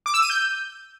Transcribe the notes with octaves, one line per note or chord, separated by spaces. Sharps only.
D6
E6
D#7
G6